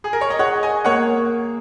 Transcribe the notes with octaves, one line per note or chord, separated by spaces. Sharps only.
G#4
A#4
C#5
D#5
G#4 C#5 F#5
D#5 G#5
A#3 C#5 F#5